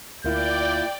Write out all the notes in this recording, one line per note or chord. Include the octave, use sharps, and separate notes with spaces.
D2 A#3 E4 F4 D5 G5 G6